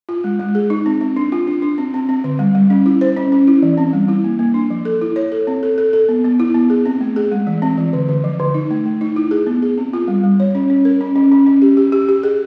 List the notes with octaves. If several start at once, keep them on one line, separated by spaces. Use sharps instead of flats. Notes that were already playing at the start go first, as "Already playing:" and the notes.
F4
G#3
G#3
G#4
D#4
C4
C4
D4
F4
D4
D4
C4
C4
C4
D3
G3
G3
C#4
E4
C5
C#4
C#4
E4
E3
C4
G3
E4
A#3
A#3
D4
F3
A4
E4
C#5
A4
C4
A4
A4
A4
B3
B3
E4
B3
G#4
C4
A3
G#4
G#3
E3
C4
E3
D3
D3
F3
D3
D#4
A3
A3
D#4
E4
G#4
B3
G#4
C4
F4
G3
G3
C#5
C#4
C#4
A#4
C#4
C#4
C#4
C#4
G4
G4
G4
G4
G#4